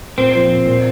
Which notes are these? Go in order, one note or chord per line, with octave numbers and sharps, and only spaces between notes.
A#2 C4
F3
A#2
A#2